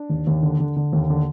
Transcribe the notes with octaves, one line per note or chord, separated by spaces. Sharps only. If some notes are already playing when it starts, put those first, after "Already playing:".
Already playing: D4
D#2
D#2
D3
D3
D3
D#2
D3